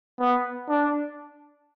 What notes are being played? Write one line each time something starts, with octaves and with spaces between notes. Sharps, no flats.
B3
D4